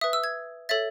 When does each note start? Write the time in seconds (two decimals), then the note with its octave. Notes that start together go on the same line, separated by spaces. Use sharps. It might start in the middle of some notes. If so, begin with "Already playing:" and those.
0.01 B4 E5 D#6
0.13 E6
0.24 G#6
0.69 A4 C#5 E5 A6